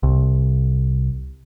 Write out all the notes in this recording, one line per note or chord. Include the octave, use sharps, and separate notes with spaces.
C2